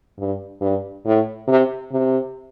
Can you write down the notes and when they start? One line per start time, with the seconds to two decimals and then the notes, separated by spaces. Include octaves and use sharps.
0.19 G2
0.61 G2
1.06 A2
1.48 C3
1.92 C3